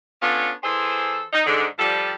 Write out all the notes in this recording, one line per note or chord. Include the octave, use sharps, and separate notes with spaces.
B3 C#4 D4 F4 A4 C#5
E3 G#4 A4 C5
D#4
G#2 D3
F3 G3 A4